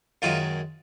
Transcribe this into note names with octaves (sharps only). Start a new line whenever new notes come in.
F#2 D#3 G#3 F4